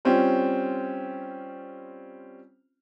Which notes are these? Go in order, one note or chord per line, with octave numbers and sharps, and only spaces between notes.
G3 C4 C#4 F4